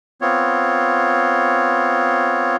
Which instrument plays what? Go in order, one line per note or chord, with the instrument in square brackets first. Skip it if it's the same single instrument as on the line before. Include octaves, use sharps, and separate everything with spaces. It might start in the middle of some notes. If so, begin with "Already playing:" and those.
[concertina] B3 C4 F4 C#5